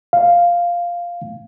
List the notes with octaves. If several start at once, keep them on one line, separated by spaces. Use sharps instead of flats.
F5